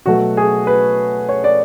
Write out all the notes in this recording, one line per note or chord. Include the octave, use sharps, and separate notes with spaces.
B2 F#3 A3 F#4
G#4
B4
C#5
D5